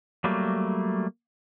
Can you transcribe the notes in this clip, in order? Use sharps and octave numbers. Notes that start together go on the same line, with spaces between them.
F#3 G3 A3 A#3